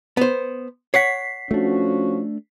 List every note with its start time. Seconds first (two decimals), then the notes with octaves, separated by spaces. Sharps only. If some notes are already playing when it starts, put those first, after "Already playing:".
0.17 B3 C5
0.94 C#5 F#5 B6 C7
1.51 F3 A3 C#4 D4 F#4